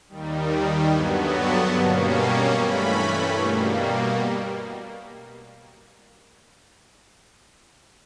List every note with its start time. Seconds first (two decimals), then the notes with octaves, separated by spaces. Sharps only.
0.09 D#2 D#3 G3
0.90 G2 D3 F#3 B3 G#5
1.32 A5
1.72 B2 G3 A#3 C#4
2.13 A5
2.53 G2 E3 A3 C#4 B5
3.35 B2 G3 A#3